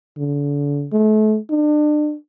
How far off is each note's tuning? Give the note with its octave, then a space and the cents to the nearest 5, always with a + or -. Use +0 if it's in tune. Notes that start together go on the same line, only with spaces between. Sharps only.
D3 -35
A3 -35
D4 +35